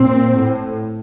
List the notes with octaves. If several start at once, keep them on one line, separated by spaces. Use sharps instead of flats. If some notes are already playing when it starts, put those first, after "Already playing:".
Already playing: A#2 C4
A2